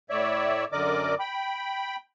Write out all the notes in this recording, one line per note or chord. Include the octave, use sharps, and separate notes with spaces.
A2 C#5 D5 E5
F#2 D3 A#4 D5 D#5 D6
G5 B5